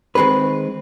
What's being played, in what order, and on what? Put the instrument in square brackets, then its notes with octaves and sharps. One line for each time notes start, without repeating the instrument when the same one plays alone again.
[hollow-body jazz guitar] D#3 G#3 C4 G#4 B4